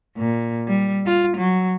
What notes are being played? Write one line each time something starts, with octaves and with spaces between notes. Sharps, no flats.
A#2
G3
F4
F#3